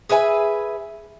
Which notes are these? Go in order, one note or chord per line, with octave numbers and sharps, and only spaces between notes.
G#4 B4 E5 G#5